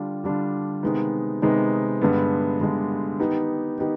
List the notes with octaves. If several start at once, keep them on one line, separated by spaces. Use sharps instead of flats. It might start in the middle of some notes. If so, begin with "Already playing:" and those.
Already playing: D3 G3 D4 F4
D3 G3 D4 F4
C3 D#3 G#3 B3 D#4
C3 D#3 G#3 B3 D#4
G2 D3 G#3 B3
G2 D3 G#3 B3
D#3 B3 D#4 G4
D#3 B3 D#4 G4